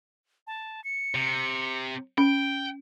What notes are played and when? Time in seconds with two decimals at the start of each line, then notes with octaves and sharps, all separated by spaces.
0.47 A5
0.84 C#7
1.15 C3
2.18 C#4 G5 D7